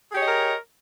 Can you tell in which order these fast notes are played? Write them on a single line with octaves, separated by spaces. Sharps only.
G#4 G4 C#5 D#5 A#4